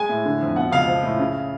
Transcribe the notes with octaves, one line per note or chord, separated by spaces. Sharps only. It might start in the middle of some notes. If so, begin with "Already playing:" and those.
Already playing: G#3 G#5
A2
D3
F2
B2 F#5
C#2 F5
F3
A2
C#3